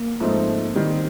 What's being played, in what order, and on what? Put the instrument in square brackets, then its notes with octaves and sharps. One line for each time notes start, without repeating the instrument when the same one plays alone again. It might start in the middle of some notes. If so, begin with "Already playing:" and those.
Already playing: [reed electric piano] A#3
[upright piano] G#2 F3 A3 C4 D#4
D#3 G3 C4